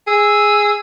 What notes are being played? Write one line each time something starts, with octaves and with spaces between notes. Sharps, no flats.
G#4 E6